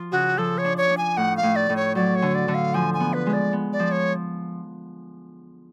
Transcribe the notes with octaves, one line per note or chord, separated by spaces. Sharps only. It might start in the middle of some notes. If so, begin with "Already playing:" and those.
Already playing: F3 F4
C#3 F#4
F3 A4
C#5
D4
C#5
D4
G#5
A2 F#5
F5
A2
D5
A2
C#5
F#3 D5
C#5
D3
D5
D3
F5
F3 G#5
G#5
B3
B4
G#3
D5
B3
D5
F3
C#5